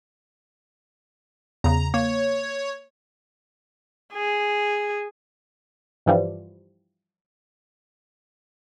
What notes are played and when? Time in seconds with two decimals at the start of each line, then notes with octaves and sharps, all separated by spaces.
1.64 E2 C#3 A#5
1.94 A#3 C#5
4.13 G#4
6.06 G2 E3 F3 G3